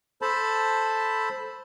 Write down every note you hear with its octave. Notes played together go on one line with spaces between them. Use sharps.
A4 C5 A5 B5